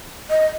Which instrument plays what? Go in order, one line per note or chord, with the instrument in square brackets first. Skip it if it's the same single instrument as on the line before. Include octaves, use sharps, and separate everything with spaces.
[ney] D#5